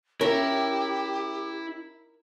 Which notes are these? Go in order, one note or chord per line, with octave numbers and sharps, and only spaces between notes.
C#4 E4 G4 A#4 E5